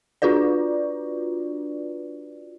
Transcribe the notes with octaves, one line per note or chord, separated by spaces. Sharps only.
D4 F4 F#4 B4 D5